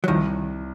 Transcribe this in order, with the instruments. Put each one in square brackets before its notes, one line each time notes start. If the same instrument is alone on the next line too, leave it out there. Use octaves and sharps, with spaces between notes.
[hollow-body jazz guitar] F#3
[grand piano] C2 [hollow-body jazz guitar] D#3 F3